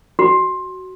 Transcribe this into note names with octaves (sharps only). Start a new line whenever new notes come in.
F#4